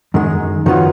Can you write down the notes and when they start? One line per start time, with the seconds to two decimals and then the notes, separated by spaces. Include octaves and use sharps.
0.14 F#2 D#3 G#3
0.66 F#2 D#3 F#3 B3 F4